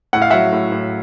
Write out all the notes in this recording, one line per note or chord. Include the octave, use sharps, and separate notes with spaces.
A2 F#5
F5
F#3 E5 F#5
A2
A2